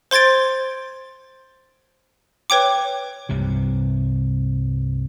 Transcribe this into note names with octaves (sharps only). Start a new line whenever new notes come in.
C5 C6 G#6 A6 D7
B4 C#5 G5 D6
C2 G2 C3